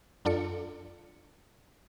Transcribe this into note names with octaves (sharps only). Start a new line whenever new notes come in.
F#2 D4 F4 A4 D5 C#7